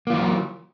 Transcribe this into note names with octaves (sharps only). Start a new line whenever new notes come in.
E3 F#3 A#3 F4